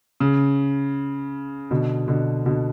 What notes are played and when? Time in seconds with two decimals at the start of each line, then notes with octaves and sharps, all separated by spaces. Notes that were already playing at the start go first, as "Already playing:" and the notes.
0.20 C#3
1.71 B2 D3
2.08 B2 D3
2.46 B2 D3